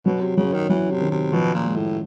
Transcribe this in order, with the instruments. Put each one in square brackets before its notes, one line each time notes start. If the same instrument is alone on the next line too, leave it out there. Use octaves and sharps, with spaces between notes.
[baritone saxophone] B2 [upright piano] F#3
[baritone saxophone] C3
[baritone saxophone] C#3 [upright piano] F#3
[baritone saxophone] D#3
[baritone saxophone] E3 [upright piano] F#3
[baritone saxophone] C3
[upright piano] D#3
[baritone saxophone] C3
[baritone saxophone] B2 [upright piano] F3
[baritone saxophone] A#2
[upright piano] G#3
[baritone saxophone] A2